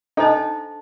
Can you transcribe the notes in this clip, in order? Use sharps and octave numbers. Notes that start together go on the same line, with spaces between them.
D4 D#4 A4 C5 D#5 A5